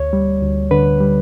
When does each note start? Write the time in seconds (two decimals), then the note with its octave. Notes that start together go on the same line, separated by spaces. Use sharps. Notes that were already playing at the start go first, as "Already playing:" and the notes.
Already playing: D2 C#5
0.13 G3
0.42 D2
0.71 D3 B4
1.00 G3